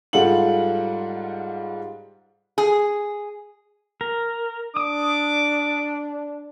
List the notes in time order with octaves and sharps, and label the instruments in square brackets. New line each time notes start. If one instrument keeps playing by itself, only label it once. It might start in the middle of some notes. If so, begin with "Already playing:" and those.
[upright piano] G#2 G3 F4 A4 F#5 F#7
[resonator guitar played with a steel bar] G#4
[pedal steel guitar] A#4
[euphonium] D4 [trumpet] D6 [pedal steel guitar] D#6